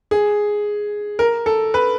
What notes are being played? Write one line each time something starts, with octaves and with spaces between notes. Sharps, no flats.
G#4
A#4
A4
B4